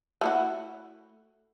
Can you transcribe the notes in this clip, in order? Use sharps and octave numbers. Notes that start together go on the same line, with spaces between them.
A3 E4 F#4